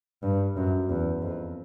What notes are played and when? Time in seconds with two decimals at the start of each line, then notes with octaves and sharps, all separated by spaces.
0.23 G2
0.57 F#2
0.89 E2
1.22 F2